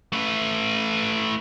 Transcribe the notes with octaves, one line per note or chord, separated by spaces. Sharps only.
A3 B4